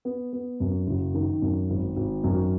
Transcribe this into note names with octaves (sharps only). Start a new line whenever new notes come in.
B3
B3
F#2
F#1
D#3
F#2
G#1
G#1
F#2